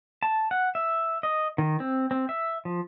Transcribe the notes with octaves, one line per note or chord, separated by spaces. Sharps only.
A5
F#5
E5
D#5
D#3
C4
C4
E5
F3